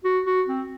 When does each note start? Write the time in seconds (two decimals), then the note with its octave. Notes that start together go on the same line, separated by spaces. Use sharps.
0.04 F#4
0.26 F#4
0.47 C4